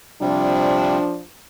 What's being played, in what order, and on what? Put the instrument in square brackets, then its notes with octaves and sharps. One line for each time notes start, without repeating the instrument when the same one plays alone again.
[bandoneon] C3 G3 [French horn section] F3 D4